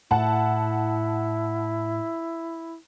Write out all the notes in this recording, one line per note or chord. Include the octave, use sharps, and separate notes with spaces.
A2 E4 F#5 A5